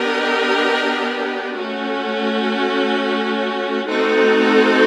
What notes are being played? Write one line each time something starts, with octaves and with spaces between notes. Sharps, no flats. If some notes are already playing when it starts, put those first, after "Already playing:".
Already playing: B3 D4 G4 A#4 D#5
A3 C#4 F#4
A3 C4 D#4 F#4 A4